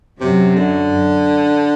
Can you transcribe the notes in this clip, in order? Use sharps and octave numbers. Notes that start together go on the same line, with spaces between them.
F#2 C3 F#3
D3